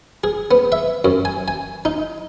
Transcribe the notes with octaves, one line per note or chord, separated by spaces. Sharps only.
G#4
B3
E5
F#2
G#5
G#5
D#4